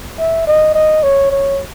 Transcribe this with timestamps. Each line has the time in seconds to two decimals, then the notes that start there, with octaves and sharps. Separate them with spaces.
0.19 E5
0.47 D#5
0.74 D#5
1.03 C#5
1.31 C#5